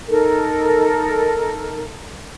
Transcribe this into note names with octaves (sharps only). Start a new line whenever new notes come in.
D#4 A4 A#4